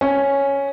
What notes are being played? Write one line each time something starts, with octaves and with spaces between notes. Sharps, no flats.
C#4